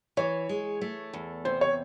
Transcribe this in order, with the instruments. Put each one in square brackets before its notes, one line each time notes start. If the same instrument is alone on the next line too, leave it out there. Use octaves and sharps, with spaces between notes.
[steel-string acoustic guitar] E3 [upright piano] C#5
[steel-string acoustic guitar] G#3
A3
E2
[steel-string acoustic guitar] C3 [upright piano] C5
[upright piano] C#5